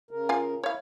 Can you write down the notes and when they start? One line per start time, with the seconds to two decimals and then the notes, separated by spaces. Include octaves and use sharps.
0.11 C#3 A#4
0.29 F4 F5 G#5
0.63 E4 C#5 F5